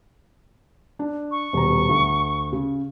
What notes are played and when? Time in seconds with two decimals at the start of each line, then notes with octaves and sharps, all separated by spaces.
0.99 D4
1.31 C#6
1.53 D#1 B2 A#5
1.89 D2
2.53 C#3